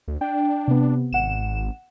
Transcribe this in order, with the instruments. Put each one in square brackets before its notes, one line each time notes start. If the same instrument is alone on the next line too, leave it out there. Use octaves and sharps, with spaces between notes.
[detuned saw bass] D2
[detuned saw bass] D4 [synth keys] G5
[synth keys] C3 B3
[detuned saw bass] G#1 [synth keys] F#5 E7